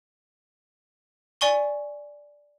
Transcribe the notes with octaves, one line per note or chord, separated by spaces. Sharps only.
D5 G#5 C#6 G7